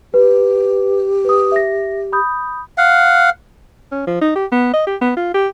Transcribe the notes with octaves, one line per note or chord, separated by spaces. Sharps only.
G4 B4
B4 D#6
E5 A#6
B5 D#6 G6
F5 F#5
C#4
F3
D#4
G4
B3
D#5
G4
B3
F4
G4